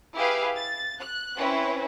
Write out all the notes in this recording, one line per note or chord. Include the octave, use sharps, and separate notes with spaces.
E4 G4 G#4 B4 F5
A6
F#6
C4 C#4 E4 B4